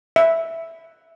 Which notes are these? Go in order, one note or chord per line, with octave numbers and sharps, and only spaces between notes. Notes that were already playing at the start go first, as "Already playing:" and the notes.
E5